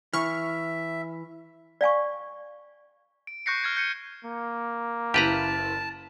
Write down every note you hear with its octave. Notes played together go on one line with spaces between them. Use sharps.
E3 E5 C#6 F6
D5 F5 G#5 C#6
D7
C#6 F#6 G6 A#6 C7 C#7
F6 G#6 A#6
G6 C#7 D#7
A#3
F#1 E4 G4 B4 A5 A#5